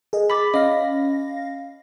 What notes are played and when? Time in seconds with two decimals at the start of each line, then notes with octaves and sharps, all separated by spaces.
0.13 G#4 D#5
0.30 B5 D6 A6 B6
0.54 C#4 D#5 F5 A#6